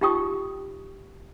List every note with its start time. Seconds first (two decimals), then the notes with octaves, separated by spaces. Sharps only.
0.01 D#4 F4 G4 G5 C#6 D#6